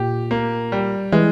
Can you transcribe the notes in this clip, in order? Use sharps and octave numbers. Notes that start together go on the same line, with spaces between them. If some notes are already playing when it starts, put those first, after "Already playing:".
Already playing: A#2 G4
A#3
G3
E3 G#3